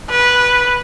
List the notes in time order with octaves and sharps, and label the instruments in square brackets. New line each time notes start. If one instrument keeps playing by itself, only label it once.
[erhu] B4